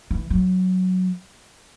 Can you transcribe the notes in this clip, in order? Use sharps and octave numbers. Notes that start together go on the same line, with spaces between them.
E3
F#3